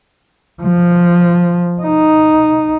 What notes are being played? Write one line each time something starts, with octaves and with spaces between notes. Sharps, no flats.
F3
D#4